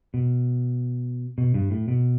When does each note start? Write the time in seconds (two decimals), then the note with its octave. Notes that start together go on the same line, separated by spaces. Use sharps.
0.14 B2
1.38 B2
1.54 G2
1.71 A2
1.88 B2